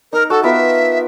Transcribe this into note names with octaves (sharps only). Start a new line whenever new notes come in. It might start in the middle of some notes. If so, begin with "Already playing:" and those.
D#4 A#4
F#4 A4 A5
B3 F4 A#4 E5